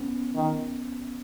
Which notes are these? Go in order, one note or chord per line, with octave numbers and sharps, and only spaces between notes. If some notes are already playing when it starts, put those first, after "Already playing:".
Already playing: B3 C#4
D#3